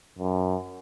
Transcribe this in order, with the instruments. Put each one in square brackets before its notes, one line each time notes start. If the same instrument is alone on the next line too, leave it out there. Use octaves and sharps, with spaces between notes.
[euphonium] F#2